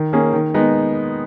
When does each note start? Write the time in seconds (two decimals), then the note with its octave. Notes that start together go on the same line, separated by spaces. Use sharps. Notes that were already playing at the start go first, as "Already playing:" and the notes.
Already playing: D#3
0.13 A#3 C#4 G#4
0.33 D#3
0.54 G#3 B3 D#4